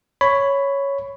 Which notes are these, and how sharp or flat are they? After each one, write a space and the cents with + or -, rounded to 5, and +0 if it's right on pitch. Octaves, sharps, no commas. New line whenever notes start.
C#5 +0 B5 +10